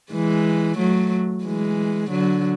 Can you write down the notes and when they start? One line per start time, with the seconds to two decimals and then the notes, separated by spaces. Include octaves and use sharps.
0.12 E3 G#3
0.78 F#3 A3
1.45 E3 G#3
2.10 D3 F#3